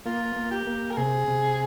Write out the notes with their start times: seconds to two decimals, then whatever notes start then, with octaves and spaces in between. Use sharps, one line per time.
0.06 A#3 F4
0.36 A#3
0.51 G4
0.67 A#3
0.91 A#4
0.97 C3 G#4
1.28 C3